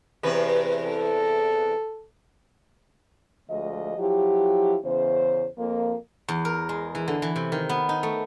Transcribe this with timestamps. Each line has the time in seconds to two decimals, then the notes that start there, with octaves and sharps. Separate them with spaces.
0.23 E2 C3 B4
0.87 A4
3.49 D2 F3 G#3 D#5
3.97 F3 F#3 E4 G4
4.83 E2 C#3 C5
5.58 F2 A#3
6.28 E2
6.45 A#4
6.69 G#3
6.95 E3
7.08 D3
7.22 E3
7.36 C3
7.52 D#3
7.69 B3
7.89 D#4
8.03 A3